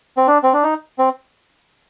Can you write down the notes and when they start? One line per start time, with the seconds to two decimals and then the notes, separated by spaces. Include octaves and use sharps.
0.17 C4
0.27 D4
0.43 C4
0.54 D4
0.63 D#4
0.98 C4